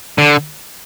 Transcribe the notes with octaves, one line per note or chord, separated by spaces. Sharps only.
D3